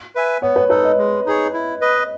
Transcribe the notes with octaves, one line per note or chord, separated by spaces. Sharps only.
B4 E5 G#5
B3 C#5
B4
D#4 A4 B4
D#5
G#3
D#4 G#4 C#5
E4
B4 D#5